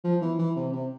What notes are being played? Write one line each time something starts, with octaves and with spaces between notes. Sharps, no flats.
F3
E3
E3
C3
C3